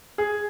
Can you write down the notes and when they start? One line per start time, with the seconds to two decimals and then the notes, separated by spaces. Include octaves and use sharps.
0.18 G#4